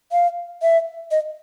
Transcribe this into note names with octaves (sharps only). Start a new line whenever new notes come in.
F5
E5
D#5